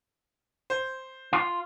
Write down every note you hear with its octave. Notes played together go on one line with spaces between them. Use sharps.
C5
F4